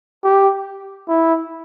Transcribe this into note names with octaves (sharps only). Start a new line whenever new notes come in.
G4
E4